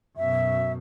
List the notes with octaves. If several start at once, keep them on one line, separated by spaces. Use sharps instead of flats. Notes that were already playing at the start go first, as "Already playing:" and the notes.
F#2 B2 E5